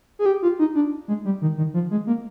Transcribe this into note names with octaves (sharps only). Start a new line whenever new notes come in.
G#4
G4
F4
D#4
D4
G#3
G3
D#3
D#3
F3
G#3
A#3